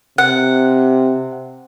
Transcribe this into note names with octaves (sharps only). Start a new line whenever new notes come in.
C3 F#5